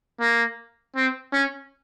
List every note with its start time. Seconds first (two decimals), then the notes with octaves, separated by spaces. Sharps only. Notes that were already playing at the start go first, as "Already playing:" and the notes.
0.21 A#3
0.96 C4
1.33 C#4